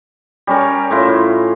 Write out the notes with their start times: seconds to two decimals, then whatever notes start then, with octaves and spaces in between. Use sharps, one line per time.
0.47 G3 C#4 A#4
0.90 A2 E4 F4
1.09 F4